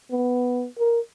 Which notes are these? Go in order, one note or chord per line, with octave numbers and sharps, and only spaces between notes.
B3
A#4